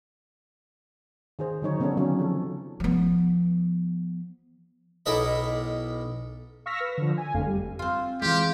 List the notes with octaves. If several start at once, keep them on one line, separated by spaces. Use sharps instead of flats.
D#3 G#4 C5
D3 F#3 D#4 C#5
C#3 B3 C#4 D4 A4 C#5
D3 F#3 C4 C#4
F3 A4
F3 B3
B1 E4 A4 A#4 D#5 B5
F5 C#6 E6 F6 A#6 B6
B4
D3 F3
G#5
G1 F2 D3 A3 F5
G3
C4 F4
E3 G#3 F4 G4